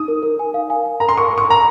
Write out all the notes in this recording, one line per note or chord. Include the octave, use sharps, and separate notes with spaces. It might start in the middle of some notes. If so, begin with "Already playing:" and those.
Already playing: D#4 D#6
A#4
A#4
G#5
F5
G#5
G#5
A#4 A#5
C6
A#4 C#6
A#4 C#6
A#4 A#5